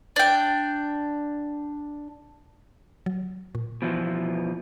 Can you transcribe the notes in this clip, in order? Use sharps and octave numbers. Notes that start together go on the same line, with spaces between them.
D4 G5
F#3
A#2
B2 E3 F3